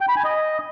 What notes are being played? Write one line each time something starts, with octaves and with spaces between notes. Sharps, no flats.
G5
B5
G#5
D#5